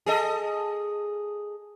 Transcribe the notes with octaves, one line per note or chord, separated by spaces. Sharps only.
G#4 A4 D#5